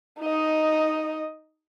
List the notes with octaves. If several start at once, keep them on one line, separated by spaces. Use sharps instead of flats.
D#4 D#5